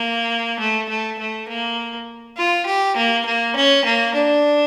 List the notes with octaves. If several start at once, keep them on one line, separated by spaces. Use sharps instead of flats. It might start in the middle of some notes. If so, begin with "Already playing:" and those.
Already playing: A#3
A3
A3
A3
A#3
F4
G4
A#3
A#3
C#4
A#3
D4